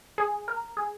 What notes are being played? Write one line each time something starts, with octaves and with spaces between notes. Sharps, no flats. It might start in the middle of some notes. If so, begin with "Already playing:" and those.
G#4
A#4
G#4